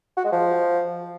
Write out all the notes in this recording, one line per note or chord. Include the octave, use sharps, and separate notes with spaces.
F#4
G#3
F3